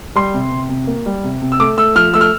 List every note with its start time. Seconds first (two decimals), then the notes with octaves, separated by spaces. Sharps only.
0.15 G3 C6
0.34 C3
0.52 C3
0.69 C3
0.87 A#3
1.06 G3
1.24 C3
1.42 C3
1.52 E6
1.60 A3 D6
1.77 A3 E6
1.95 F3 F6
2.14 A3 E6
2.21 F6